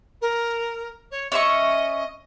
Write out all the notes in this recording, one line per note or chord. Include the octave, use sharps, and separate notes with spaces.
A#4
C#5
C#4 D#5 E5 C#6